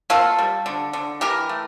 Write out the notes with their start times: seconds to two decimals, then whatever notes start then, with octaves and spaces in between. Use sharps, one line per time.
0.10 A#3 F4 A4
0.39 G3
0.66 D3
0.93 D3
1.21 E3 G4 A#4
1.49 A3